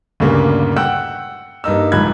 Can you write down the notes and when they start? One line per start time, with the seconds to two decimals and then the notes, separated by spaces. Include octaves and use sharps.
0.20 D2 G2 A#2 C#3 A#3
0.77 F#5 G5 E6 F#6
1.64 G2 A#3 D#4 E6
1.92 D1 G#2 F3 B5 F#6 G#6